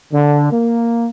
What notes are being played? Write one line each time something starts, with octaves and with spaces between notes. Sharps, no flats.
D3
A#3